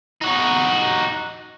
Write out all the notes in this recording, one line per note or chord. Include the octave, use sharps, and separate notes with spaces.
D#4 F#4